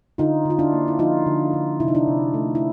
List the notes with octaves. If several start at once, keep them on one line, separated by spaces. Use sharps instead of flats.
D3 D#4 F4
D3 F4
D4 E4
A#3
E4
F3 D#4 F4
D3
D3
C3 E4
D#4
D4 E4
C3
A3
E4